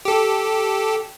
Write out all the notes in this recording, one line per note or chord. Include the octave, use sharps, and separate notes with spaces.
G4 A4